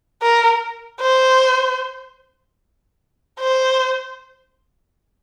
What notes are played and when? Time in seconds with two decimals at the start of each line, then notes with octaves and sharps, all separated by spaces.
0.23 A#4
1.01 C5
3.40 C5